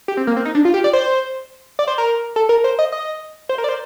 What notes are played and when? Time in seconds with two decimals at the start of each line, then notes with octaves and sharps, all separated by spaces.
0.08 G4
0.17 C4
0.27 A#3
0.37 C4
0.45 D#4
0.55 D4
0.65 F4
0.74 G4
0.84 D5
0.93 C5
1.79 D5
1.87 C5
1.98 A#4
2.36 A4
2.49 A#4
2.64 C5
2.79 D#5
2.92 D#5
3.49 C5
3.58 A#4
3.64 D5
3.69 C5